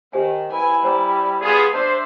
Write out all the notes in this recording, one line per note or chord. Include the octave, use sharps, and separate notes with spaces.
D#3 G4 C5 G#5
E4 B4 G#5
G3 C5 A#5
B3 F4 G#4
D4 C5 E5 A5